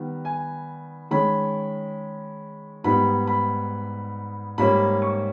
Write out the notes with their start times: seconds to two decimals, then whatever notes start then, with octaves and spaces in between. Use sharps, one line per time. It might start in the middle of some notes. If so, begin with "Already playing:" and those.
Already playing: D#3 G3 B3
0.25 G#5
1.11 D#3 G#3 C#4 B5
2.84 G#2 G3 B3 D#4 B5
3.27 B5
4.58 G#2 G3 A#3 C#4 B5
5.02 C#6